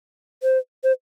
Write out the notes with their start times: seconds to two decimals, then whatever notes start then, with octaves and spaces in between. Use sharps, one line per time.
0.43 C5
0.84 C5